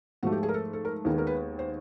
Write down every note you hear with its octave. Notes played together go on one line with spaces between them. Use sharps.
G#2 F3 A3 F#4
G4
G#4
A#4
A4
A4
A#4
D#2 D#3 G#3 B3 A#4
A#4
B4
C5